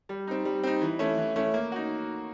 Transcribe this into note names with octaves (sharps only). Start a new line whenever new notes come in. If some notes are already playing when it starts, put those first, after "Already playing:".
G3
C4 D#4
G3
C4 D#4
E3
A3 C#4 E4
E3
A3 C#4 E4
A#3
D#4 F#4